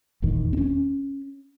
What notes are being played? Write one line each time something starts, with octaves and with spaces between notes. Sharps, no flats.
F1 A#1 E2 D#3
C4 C#4